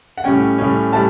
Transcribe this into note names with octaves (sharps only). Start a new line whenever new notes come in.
F#5
A2 G3 C#4 G5
A2 G3 C#4
A2 G3 A5